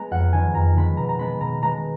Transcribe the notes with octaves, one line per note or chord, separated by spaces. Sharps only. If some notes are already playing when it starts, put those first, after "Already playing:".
Already playing: G#3 B3 A#5
F2 F#5
D#3 G#3 B3 G#5
F2 A#5
D#3 G#3 B3 B5
B2 A#5
A#5
G#3 B3 B5
B2 A#5
G#3 B3 A#5